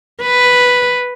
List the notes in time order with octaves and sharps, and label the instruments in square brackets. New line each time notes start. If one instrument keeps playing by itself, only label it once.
[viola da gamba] B4